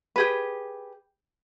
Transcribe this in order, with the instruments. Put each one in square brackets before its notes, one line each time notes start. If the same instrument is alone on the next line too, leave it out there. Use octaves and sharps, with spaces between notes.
[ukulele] G4 G#4 B4